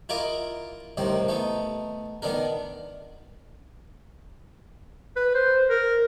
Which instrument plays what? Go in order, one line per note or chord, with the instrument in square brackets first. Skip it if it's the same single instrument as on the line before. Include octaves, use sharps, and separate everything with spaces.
[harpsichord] E4 F4 A#4 D#5 A#5 D6
C2 A2 D#3 C4
A3 B3 D#4
D#3 B3 D4 A#4
[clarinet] B4
C5
A#4